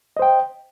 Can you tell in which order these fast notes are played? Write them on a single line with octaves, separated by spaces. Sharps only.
D#5 C5 G5